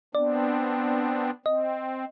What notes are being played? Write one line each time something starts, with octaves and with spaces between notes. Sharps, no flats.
B3 C4 D4 D5
C4 D#5